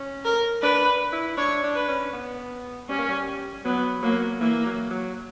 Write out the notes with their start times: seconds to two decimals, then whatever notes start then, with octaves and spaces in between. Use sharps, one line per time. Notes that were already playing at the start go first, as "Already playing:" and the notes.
Already playing: C#4
0.25 A#4
0.62 D4 B4
1.13 E4
1.37 D4 C#5
1.63 D4
1.75 B4
1.89 C#4
2.13 B3
2.89 G3 C#4
2.98 A#3
3.09 G3
3.65 F#3 B3
4.03 F#3 A#3
4.40 E3 A#3
4.66 F#3
4.91 F#3